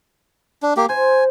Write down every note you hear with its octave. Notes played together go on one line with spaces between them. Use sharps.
D4
A#3 G4
C5 G#5